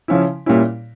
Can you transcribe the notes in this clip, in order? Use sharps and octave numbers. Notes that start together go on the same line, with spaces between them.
C#3 F3 C#4 E4
A#2 G3 C#4 E4